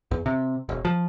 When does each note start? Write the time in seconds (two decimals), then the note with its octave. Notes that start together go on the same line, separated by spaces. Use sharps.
0.11 E2
0.26 C3
0.69 E1
0.85 F3